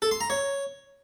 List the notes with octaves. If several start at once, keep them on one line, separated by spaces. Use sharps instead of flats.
A4
C6
A#5
C#5